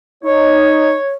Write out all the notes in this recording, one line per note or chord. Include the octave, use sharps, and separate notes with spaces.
D#4 C#5